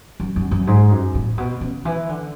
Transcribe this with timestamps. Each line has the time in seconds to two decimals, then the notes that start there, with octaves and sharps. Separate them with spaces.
0.20 F#2
0.36 F#2
0.51 F#2
0.67 G#2
0.91 F#2
1.15 A2
1.38 B2
1.61 C#3
1.85 E3
2.09 D3